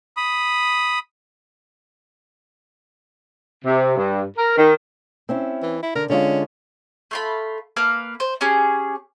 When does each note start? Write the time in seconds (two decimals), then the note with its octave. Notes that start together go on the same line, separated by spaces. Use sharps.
0.17 B5 D#6
3.64 C3
3.97 G2
4.37 A#4
4.57 D#3
5.29 C4 C#4 E4
5.62 E3
5.83 E4
5.95 D3 A#4
6.10 D3 G#3 C#4 F4
7.11 A3 F4 B5
7.77 A#3 B4 F5 F6
8.20 C5
8.41 C#4 G4 G#4